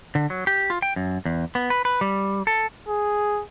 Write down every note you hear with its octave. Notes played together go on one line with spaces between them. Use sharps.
D3
F#3
G4
F4
G5
F#2
E2
B3
B4
B4
G3
A4
G#4